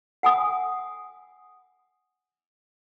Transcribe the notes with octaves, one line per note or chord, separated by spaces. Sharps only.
F#5 G#5 D#6